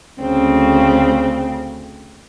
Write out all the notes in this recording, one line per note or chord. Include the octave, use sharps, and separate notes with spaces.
D2 C#3 C4